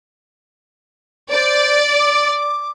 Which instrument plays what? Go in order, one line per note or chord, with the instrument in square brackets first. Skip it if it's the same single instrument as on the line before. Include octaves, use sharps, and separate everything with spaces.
[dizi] C5 [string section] D5
[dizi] D6